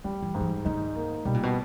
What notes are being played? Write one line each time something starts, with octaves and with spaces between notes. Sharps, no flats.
E3 G3
E3
G#2
E3
D#3 D#4
A#3
B2 G3
A#2
B2